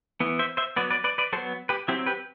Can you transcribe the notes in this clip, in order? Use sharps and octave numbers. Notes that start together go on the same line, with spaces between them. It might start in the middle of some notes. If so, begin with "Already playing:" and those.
E3 B3
C5 E5
C5 E5
F#3 B3 B4 D5
B4 D5
B4 D5
B4 D5
F#3 B3 A4 C5
G4 B4
F#3 C4 E4 G4
G4 B4